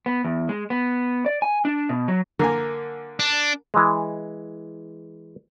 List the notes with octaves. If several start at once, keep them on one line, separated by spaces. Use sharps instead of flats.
B3
E2
G#3
B3
D5
G#5
D4
B2
F#3
D3 A#3 A#4 G#5
D4
E3 G#3